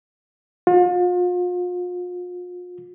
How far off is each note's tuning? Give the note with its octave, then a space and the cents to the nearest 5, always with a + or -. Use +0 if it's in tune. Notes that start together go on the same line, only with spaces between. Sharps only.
F4 +40